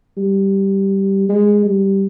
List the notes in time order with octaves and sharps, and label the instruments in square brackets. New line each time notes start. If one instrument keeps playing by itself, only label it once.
[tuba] G3
G#3
G3